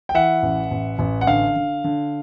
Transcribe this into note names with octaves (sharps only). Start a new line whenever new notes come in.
G5
E3 E5 F#5
A1
A1
A1
F#5
D3 F5
D3
D3